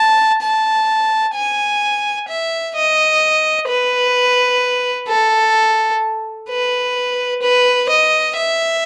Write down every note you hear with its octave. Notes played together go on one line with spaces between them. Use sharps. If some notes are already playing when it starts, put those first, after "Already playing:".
Already playing: A5
A5
G#5
E5
D#5
B4
A4
B4
B4
D#5
E5